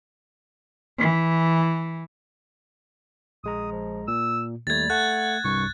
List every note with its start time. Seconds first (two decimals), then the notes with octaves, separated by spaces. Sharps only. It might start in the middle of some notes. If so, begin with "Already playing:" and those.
0.98 E3
3.44 A#1 G#3 A#5 D#6
3.72 F3
4.08 A#2 E6
4.67 D#2 G3 A3 G#6 A6
4.90 A3 F#5 F#6
5.44 C2 G2 C#6